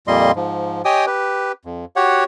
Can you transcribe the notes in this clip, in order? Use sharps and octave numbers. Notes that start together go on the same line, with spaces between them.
F2 A#2 G3 A#3 D#5 C6
G#2 F3
G4 C#5 D#5 G5 G#5 D#6
G4 B4
F2
F#4 G4 C#5 F#5